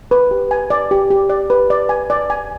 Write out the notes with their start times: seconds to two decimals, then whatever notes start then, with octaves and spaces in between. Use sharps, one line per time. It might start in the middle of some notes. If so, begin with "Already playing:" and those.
0.11 B4
0.31 G4
0.51 G#5
0.70 D5
0.91 G4
1.11 G4
1.30 D5
1.50 B4
1.70 D5
1.89 G#5
2.10 D5
2.30 G#5